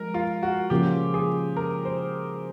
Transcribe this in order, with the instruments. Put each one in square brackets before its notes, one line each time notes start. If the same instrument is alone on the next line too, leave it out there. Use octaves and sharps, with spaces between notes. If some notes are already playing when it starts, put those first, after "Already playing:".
Already playing: [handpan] F3 G#3 [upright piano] A#4
[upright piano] F4
F#4
[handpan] C#3 F3 A#3 C#4 F4 [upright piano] G4
[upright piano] G#4
A#4
C5